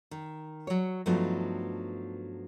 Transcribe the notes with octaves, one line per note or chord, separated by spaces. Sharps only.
D#3
F#3 C#5
G2 F3 F#3 A3 B3 D#4